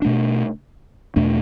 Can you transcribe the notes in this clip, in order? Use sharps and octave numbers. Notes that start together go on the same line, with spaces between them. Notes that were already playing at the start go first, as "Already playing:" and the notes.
B2 A3 D4
E2 B2 A3 D4